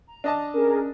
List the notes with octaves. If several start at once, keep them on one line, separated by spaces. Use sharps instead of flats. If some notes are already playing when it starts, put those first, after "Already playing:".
A#5
D4 D#5 A5
C#4 G#4 A#4